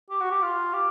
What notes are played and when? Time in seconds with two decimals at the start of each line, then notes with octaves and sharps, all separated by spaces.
0.10 G4
0.20 F#4
0.31 G4
0.42 F4
0.73 G4